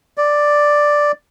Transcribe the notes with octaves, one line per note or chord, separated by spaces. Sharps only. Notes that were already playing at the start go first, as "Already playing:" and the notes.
D5